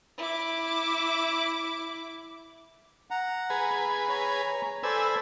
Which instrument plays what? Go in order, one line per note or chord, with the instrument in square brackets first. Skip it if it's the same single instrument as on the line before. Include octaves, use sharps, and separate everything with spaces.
[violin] E4 D6
[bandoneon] F#5 A#5
[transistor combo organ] G#4 B4
[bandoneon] C#5 A#5
[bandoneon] A4 C5 D5 [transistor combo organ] B4 G#5 E6